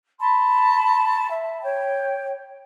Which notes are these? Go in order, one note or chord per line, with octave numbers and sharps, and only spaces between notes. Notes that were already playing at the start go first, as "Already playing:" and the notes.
A5 B5 C6
E5
C#5 G5